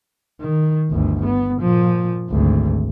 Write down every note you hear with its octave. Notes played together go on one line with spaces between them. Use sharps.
D#3
G1 D2
B3
A#2 F3
G#1 D2